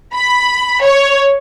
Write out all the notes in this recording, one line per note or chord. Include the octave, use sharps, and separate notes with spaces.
B5
C#5